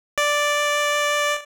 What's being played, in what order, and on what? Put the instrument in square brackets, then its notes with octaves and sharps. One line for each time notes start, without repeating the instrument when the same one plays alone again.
[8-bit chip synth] D5